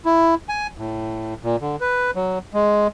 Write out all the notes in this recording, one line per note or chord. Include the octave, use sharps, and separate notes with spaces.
E4
G#5
A2
A#2
D3
B4
F#3
G#3